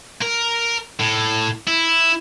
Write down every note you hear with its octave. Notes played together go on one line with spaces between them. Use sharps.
A#4
A2
E4